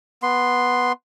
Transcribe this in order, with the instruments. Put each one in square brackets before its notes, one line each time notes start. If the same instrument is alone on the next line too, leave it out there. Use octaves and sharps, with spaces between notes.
[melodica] B3 C6